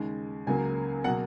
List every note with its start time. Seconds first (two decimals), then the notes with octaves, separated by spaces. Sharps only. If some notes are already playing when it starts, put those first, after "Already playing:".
Already playing: D#2 C#3 G#3
0.47 C#2 C#3 F#3 A#3 G#5
1.04 B2 F#3 A#3 F#5